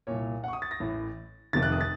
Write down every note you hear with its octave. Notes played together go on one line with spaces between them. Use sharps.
C2 A#2 C#5
F#5
C#6
D#6
A6
A#6
A1 A2
F1 F2 C3 D#3 A6
F#6
D#6
A6